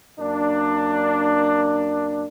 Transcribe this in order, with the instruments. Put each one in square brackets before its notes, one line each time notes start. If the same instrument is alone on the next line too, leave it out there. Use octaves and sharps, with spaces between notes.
[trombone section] F#2 A#3 D4